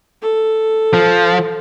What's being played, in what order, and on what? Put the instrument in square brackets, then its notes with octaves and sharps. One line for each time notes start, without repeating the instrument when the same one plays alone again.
[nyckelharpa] A4
[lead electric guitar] F3